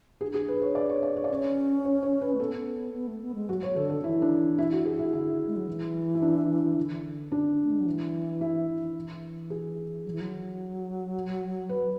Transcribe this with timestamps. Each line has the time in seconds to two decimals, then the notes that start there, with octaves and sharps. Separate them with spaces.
0.21 D4 G#4
0.34 G#4
0.48 B4
0.62 C#5
0.75 D5
0.89 C#5
1.03 D5
1.16 C#5
1.24 D5
1.29 C#4 C#5
1.85 C#5
2.03 C#5
2.21 B4
2.35 A3
2.40 B3 A4
2.94 B3
3.08 A3
3.22 B3
3.35 G#3
3.49 F#3 F#4
3.63 C#5
3.76 D3 A4
3.90 A4
4.04 E3 E4
4.22 D4
4.58 E4
4.72 F#4
4.85 G#4
4.99 E4
5.13 D3 E4
5.47 G#3
5.56 F#3
5.68 E3
6.15 E4
6.22 D4
6.77 D3
7.32 D4
7.65 A3
7.72 G#3
7.80 F#3
7.86 E3
8.41 E4
8.95 E3
9.50 G#4
10.05 F#3
10.12 E3
10.21 F#3
11.69 B4